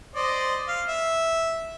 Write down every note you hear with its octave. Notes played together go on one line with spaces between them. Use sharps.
C5 D5 D#5
F5
E5